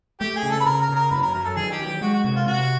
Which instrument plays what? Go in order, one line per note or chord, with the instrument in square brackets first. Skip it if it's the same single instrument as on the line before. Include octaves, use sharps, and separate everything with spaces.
[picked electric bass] A3 [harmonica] G4
[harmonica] G#4
[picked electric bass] C#3
[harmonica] A4
B4
[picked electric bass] C#3 [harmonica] A#4
[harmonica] A#4
[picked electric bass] C#3
[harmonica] A#4
[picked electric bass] F#2 [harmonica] B4
[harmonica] A#4
[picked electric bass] F#3 [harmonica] A#4
[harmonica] A4
[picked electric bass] D#3 [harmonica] G#4
[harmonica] G4
[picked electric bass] F#3
[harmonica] G4
[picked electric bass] G#3 [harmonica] F#4
[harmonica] F#4
[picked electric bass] C3 [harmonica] F#4
[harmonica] F4
[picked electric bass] C3 [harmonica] F#4